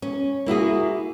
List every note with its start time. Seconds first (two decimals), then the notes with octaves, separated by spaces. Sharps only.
0.02 C#4
0.46 A#3 E4 F#4 G#4